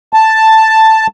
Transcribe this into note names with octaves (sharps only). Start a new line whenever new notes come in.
A5